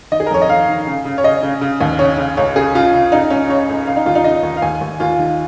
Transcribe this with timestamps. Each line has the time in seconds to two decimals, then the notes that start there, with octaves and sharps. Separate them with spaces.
0.12 D#3 D#5
0.20 G#4
0.26 A#4
0.31 F2 C#5
0.42 D#5
0.48 D#3 F5
0.68 D#3
0.87 C#3
1.05 C#3
1.18 C#5
1.24 C#3 D#5
1.43 C#3
1.61 C#3
1.81 D#2
1.99 C#3 C#5
2.18 C#3
2.37 C#2 C#5
2.56 C#3 G#4
2.74 C#3 F4
2.94 C#3
3.12 C#3 D#4
3.30 C#2 C#4
3.49 C#3 C#5
3.69 C#2
3.87 C#3 F5
3.96 D#4
4.06 D#2 F4
4.15 D#4
4.24 C#3 D#5
4.43 D#2
4.57 F5
4.62 D#2 G#5
4.81 D#2
5.00 D#2 F4
5.19 D#3